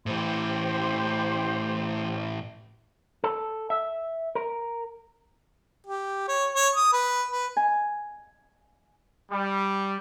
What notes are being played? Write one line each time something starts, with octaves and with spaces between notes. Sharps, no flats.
A2 E3 G4 C5 C6
A4
E5
A#4
G4
C#5
C#5
D#6
B4
B4
G#5
G3